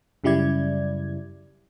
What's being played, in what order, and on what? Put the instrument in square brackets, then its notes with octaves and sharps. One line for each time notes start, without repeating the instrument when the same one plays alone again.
[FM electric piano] F#2 C#3 G3 E4 D5 G#6